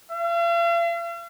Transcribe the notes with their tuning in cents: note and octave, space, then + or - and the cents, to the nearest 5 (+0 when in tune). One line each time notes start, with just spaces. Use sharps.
F5 -45